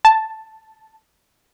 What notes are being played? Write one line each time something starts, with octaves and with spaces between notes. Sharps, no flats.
A5